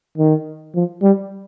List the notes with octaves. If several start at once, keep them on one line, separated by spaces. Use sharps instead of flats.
D#3
F3
G3